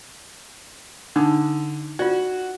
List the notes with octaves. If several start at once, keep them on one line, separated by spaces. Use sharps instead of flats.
D3 D4 D#4 D#6
F4 F#4 D5